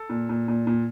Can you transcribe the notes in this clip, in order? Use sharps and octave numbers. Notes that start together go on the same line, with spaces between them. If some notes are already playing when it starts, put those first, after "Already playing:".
Already playing: A4
A#2
A#2
A#2
A#2